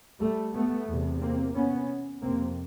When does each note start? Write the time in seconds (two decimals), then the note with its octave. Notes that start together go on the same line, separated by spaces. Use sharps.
0.20 G3 A3
0.54 A3 B3
0.87 E2 C3
1.21 A#3 C4
1.55 B3 C#4
2.22 F2 C3 A#3 C4